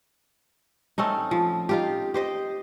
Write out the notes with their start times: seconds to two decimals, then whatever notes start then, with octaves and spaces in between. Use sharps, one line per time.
0.98 A3 C4 C#4 D#4
1.31 F3
1.69 D#4 F4 G4
2.14 G4 C5 D#5